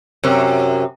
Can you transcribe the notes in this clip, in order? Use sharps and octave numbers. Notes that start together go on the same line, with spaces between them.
F#2 C3